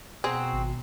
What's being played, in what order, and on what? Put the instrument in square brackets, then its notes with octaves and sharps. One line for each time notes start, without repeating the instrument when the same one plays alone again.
[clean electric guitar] B2 A#5 C6 [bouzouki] C4 F#4 [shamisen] G#4
[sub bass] G#1